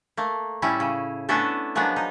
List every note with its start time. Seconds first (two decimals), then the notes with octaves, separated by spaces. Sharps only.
0.17 A3 A#3
0.62 A2 G3 C#4 E4
0.80 C#3
1.29 A3 B3 C#4 D4 E4 A4
1.75 F3 F#3 G#3 A#3 B3 D4
1.96 D#4